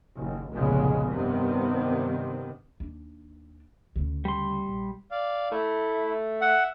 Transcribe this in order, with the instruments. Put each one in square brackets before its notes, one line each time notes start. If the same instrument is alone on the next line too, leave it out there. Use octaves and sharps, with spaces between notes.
[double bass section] F#1 D#2
F1 B1 A#2 C#3 G#3 B3
G2 C3 D#3 B3 C4
[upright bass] D#2 D4
D2 C#3
[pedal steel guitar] G3 C6
[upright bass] A#1
[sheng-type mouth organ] D5 F5
[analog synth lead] A3 [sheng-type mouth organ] E4
[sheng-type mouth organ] E5 [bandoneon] F#5